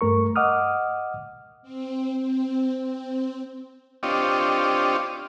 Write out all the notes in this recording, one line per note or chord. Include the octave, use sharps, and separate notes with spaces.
G2 A3 A#4 C#6
D#5 F#5 D6 D#6 F6
C4
C4
C4
C4 D4 F4 G4 C#5 D#5